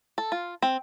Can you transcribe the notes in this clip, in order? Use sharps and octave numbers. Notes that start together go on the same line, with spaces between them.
A4
F4
C4